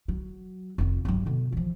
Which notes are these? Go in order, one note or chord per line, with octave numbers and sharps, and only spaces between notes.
F#3
F1 F4
G2 F#3
B2 D3
E3 F3